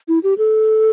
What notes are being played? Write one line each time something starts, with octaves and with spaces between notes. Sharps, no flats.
E4
G4
A4